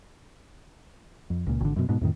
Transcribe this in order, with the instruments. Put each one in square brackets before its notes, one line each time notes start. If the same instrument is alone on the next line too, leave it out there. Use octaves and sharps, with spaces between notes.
[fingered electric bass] F2
C#2 A#2
G#1 D3
F#2 B2
G#2 B2
F2 A2 D#3